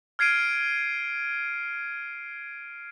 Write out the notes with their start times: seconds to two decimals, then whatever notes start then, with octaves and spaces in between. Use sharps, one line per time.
0.19 F6 G#6 C7 D7 D#7